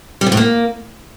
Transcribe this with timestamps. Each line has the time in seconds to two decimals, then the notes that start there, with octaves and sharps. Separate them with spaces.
0.21 G3
0.26 D3
0.32 A2
0.37 A#3